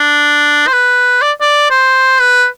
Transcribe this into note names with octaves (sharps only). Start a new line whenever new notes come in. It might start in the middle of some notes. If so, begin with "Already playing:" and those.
Already playing: D4
C5
B4
D5
D5
C5
B4